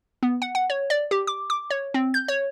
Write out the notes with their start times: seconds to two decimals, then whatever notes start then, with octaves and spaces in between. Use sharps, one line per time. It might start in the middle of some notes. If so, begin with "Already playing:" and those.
0.23 B3
0.42 F#5
0.55 F#5
0.70 C#5
0.90 D5
1.11 G4
1.27 D6
1.50 D6
1.70 C#5
1.94 C4
2.14 G6
2.28 C#5